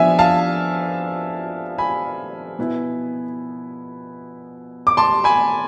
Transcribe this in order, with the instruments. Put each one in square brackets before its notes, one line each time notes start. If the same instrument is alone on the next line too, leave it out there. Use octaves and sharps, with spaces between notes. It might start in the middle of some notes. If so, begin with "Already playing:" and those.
Already playing: [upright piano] F3 B3 D4 E5 G#5
F5 A5
G#5 B5
B2 B3 E4
D6
A5 C6
G#5 B5